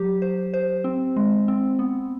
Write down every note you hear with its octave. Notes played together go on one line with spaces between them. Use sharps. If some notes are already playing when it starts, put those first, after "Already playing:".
Already playing: F#3 G4
C5
C5
C4
G#3
C4
B3